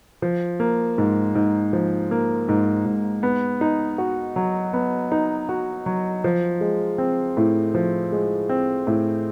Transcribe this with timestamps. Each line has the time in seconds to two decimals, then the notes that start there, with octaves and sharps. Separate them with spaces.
0.22 F3
0.60 A#3
0.98 G#2
1.35 G#2
1.73 F3
2.11 A#3
2.48 G#2
2.86 G#2
3.23 B3
3.61 D#4
3.98 F#4
4.36 F#3
4.73 B3
5.12 D#4
5.49 F#4
5.86 F#3
6.24 F3
6.61 G#3
6.98 C4
7.37 A2
7.75 F3
8.12 G#3
8.49 C4
8.87 A2